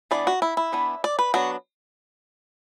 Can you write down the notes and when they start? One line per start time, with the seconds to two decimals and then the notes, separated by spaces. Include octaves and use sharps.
0.11 E3 B3 D4 D5
0.27 F#4
0.42 E4
0.57 E4
0.72 E3 B3 D4
1.04 D5
1.19 B4
1.34 F#3 B3 D4 F#4